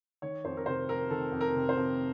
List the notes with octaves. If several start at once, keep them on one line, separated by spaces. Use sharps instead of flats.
D#3 C#5
F2 C5
A#4
C3 C5
F2 A#4
D#3 A4
F2
A#4
C3
C5
F2